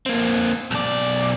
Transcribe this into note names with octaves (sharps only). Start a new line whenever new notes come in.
A#3 C4
B1 D5